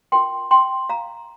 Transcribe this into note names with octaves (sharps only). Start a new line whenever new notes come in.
F4 A#4 G5 C6
G5 C6
F5 A#5